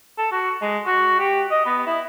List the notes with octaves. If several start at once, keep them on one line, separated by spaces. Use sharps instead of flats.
A4
F#4
G#3
F#4
G4
D#5
B3
E4